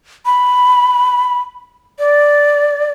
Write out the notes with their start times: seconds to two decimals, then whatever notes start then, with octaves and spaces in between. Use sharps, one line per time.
0.26 B5
1.99 D5